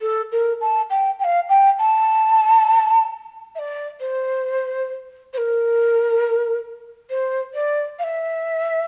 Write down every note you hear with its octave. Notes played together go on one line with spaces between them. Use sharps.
A4
A#4
A5
G5
G5
F5
G5
A5
E5
D5
C5
C5
A#4
C5
D5
F5
E5